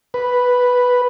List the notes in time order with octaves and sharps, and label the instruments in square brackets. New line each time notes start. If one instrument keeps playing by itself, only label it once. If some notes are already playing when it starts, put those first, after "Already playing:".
[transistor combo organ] B4